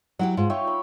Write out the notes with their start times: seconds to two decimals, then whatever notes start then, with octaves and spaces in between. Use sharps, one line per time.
0.19 F#3 E4 G4 F#5
0.37 G#2 F4
0.50 D#4 C#5 E5 G5
0.67 B5